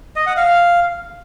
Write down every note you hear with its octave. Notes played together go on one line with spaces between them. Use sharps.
D#5
F#5
F5